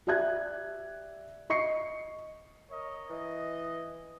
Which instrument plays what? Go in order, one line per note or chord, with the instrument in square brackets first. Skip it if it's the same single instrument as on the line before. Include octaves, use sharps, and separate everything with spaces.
[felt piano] G4 D5 E5 F#6 G#6
D#5 C#6 C7 C#7
[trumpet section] A#4 C#5 D#5
[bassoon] E3 [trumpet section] D#5